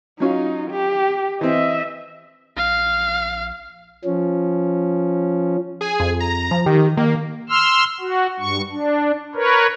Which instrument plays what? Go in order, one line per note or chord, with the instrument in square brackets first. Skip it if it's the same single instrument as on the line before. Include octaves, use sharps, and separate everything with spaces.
[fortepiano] F#3 C#4 F4 [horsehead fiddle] D#4
[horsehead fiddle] G4
[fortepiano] E3 C4 [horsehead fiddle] D#5 E5
[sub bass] A#1 [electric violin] F5
[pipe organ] F3 C#4
[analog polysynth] G#4 G#5
[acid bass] F2
[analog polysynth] A#5
[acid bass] F3
[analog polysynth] D#3 [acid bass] G4
[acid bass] D#3 [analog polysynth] A#3
[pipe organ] C6 E6 F6
F#4
G2 C#6
D4
A#4 B4 C#5